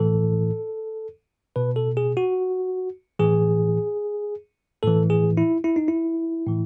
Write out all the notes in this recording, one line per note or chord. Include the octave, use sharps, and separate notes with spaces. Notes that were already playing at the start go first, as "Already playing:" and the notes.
Already playing: A2 E3 A4
B2 B4
A4
G#4
F#4
A2 E3 G#4
A2 E3 A4
G#4
E4
E4
D#4
E4
A2 E3